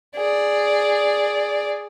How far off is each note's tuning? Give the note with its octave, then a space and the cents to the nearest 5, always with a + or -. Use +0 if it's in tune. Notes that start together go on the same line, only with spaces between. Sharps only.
G#4 +0 D5 +0